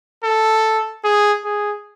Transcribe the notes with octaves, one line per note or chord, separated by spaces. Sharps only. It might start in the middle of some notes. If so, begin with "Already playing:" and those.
A4
G#4
G#4